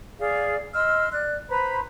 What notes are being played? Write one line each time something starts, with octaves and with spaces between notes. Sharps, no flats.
G#4 D5 F5
D#5 C6 E6 F6
D5 F#6
B4 C5 A#5 B5